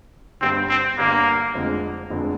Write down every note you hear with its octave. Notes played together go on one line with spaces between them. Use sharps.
G1 G2 D3 C4
C4
G1 G2 D3 A#3
F1 F2 D3 G#3
F1 F2 D3 G#3